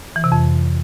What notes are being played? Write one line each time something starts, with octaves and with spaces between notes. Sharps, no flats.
E3
C3
F2